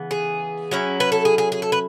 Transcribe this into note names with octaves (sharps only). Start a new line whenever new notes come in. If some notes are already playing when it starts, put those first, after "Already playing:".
Already playing: C#3 E3 B3
G#4
F#3 C#4 E4
B4
A4
G#4
G#4
G#4
A4
B4